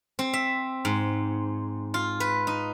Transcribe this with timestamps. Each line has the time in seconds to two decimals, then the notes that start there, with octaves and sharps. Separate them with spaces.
0.19 C4
0.33 E5
0.85 G#2
1.94 F4
2.20 B4
2.47 D#4